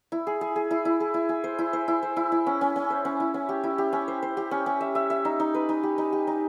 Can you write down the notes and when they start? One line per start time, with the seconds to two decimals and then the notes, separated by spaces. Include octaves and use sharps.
0.12 E4
0.27 G#4
0.41 G#4
0.56 G#4
0.71 E4
0.85 E4
1.00 G#4
1.14 E4
1.29 G#4
1.44 C5
1.59 E4
1.73 C5
1.88 E4
2.03 C5
2.16 E4
2.32 E4
2.46 C#4
2.61 C#4
2.76 C#4
2.90 C5
3.05 C#4
3.20 E4
3.34 C#4
3.49 G4
3.64 E4
3.78 G4
3.93 C#4
4.08 C5
4.23 C5
4.37 G4
4.51 C#4
4.66 C#4
4.81 E5
4.95 E5
5.10 E5
5.25 D#4
5.40 D#4
5.54 B4
5.69 D#4
5.83 G4
5.98 D#4
6.13 G4
6.27 D#4